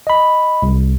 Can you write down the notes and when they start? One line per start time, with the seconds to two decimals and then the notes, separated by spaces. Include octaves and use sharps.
0.07 D#5 B5
0.62 C2